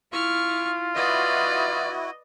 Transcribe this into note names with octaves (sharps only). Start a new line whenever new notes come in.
E4 F4 C#6 F6
E4 F#4 B4 D5 D#5